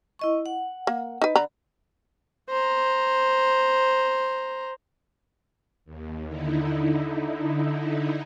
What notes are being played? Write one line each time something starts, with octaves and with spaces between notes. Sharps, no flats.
E4 D#5 C#6
F#5
A#3
D#4 B4
D3 A#5 B5
C5 A#5
D#2
D3 D#4 E4